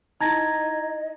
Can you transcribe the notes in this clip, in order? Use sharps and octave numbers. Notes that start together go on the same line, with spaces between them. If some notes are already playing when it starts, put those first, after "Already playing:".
D#4 E4 D#5 A#5 G#6 A#6